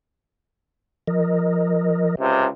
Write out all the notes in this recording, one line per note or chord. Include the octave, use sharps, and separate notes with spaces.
F3 A#4 D#5
C#2 C3